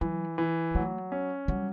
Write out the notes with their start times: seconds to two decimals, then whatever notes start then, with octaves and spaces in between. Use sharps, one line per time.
0.01 E3 F#3
0.38 E3
0.75 F#3 A3
1.12 C#4
1.48 F#3 G3